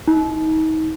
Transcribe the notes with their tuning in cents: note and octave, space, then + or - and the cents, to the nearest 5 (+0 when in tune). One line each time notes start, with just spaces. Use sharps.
D#4 +30